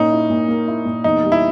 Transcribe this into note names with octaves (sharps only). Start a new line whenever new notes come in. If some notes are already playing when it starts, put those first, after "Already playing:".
Already playing: A#2 C#4 D#4
E4
A#2
A#3
E4
A#2
E2 D#4
G3
E4